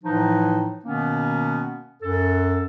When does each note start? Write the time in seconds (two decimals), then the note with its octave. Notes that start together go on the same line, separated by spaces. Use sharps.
0.04 A2 E3 F3 D#4
0.85 B2 D#3 A#3 B3 C#4
2.03 F#2 A4